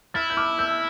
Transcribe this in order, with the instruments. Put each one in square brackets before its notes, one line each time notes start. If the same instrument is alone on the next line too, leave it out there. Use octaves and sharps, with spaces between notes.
[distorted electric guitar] E4 [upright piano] F6 A6
[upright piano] G6
D6 F6
E6 G6